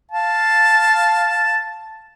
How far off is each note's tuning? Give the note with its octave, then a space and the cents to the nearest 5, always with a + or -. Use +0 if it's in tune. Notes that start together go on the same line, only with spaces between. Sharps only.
F5 +0 A5 +0